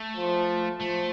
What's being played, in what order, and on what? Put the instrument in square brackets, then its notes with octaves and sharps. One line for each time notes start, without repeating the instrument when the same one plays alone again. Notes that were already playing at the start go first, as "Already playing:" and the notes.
Already playing: [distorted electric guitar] A3
[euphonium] F3
[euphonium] F3 [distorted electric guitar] A3